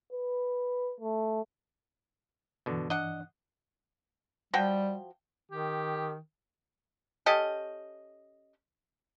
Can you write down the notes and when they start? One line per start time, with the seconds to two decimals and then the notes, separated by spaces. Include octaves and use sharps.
0.13 B4
1.00 A3
2.66 G2 B2 D3 E3
2.90 D4 D#5 F#5
4.54 F3 G3 F#4 G5
5.51 D#3 G4
7.26 C#4 G4 A4 D#5